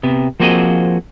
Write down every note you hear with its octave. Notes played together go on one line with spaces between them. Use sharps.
C3 B3
F3 A#3 C4 F#4 G#4 D#5